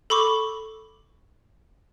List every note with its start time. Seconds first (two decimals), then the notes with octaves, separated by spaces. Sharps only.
0.10 A4 B5 C#6 D6